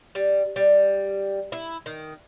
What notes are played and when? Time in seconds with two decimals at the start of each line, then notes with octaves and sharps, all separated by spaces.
0.15 G3
0.56 G3
1.52 E4
1.86 D#3